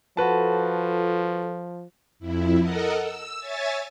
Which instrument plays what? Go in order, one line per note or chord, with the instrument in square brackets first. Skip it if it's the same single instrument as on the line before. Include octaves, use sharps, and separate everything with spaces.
[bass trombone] F3 [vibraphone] F4 A4 [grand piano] F#4 B4 A5
[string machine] F2 E4
A4 A#4 D#5 F#5
E6
C#5 E5 G#5 A6